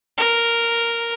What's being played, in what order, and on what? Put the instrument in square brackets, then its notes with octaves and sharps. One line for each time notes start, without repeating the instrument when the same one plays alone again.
[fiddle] A#4